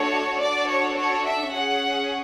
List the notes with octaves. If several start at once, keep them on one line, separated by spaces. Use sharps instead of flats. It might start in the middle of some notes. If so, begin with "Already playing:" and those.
Already playing: A3 D4 F#4 A4 C#5
D4 F#4 A4 D5
C#5
C#5
E5
C#4 G#4 F#5